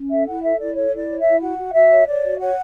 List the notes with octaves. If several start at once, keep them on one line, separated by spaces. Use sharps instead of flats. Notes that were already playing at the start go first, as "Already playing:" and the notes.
Already playing: C#4
A4 E5
E4 F#5
A4 E5
E4 D5
A4 C#5
E4
D5
C#5
E5
E4
F#4 F#5
F#4
F#4 E5
C#5
C#5 D5
F#4
C#5 F#5